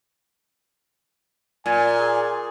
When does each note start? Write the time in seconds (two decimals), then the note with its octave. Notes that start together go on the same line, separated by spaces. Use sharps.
1.66 A#2 G#5
1.99 G#4